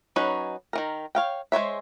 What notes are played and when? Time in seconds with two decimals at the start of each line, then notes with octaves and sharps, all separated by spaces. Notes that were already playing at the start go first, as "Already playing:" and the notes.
0.16 F#3 C#4 D#4 B4 C#5
0.73 D#3 E3 A#4
1.15 C#5 F5 G5
1.52 G#3 C5 C#5 E5